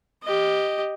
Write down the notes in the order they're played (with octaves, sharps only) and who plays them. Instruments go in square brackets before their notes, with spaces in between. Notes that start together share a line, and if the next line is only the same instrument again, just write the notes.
[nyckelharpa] G4 D#5